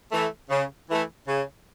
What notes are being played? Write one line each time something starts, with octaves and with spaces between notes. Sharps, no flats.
E3 A3
C#3
E3 A3
C#3